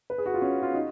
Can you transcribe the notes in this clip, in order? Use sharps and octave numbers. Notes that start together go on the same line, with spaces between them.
B4
G#4
F#4
F4
C#4
F4
D#4